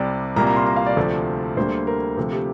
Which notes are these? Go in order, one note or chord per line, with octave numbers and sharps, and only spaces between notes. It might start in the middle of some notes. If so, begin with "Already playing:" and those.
Already playing: C2 C3 G3 D5
C2 A#2 G3 A#3 A#5
A#5
C6
A#5
F5
D5
D2 C3 F3 A3
D2 D3 G3 A#3 C5
A#4
D2 C3 F3 A3
G4